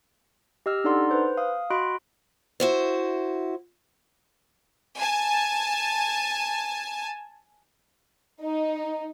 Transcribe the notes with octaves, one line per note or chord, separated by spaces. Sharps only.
G4 D#5 E6 F6
D4 D#4 A4 D5 F#5 C6
B4 C5
F5 D#6
F#4 D#5 B5 C6 F#6 D7
E4 F#4 C5
G#5 A5
D#4